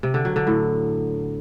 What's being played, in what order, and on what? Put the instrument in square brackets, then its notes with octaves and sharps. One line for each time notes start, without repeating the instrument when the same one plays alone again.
[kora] C3
D3
F#3
D3
A2